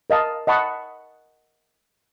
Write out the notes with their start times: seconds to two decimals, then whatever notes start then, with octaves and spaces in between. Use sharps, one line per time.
0.10 A#4 D#5 F5 A5
0.47 D#5 F#5 A5 B5 C#6